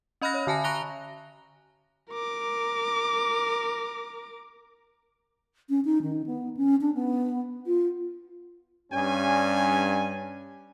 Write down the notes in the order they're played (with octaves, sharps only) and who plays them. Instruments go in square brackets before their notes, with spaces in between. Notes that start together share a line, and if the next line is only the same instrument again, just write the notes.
[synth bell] C#4 D#5 B5 F6 F#6 A#6
C#5
D3 G#5 A5 A#6
A#5 C#6 F#6 A#6 F7 G7
[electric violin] A#4 D6
[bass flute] C#4
D#4
D#3
B3
C#4
D4
B3
F4
[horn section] G2 C#4 G#5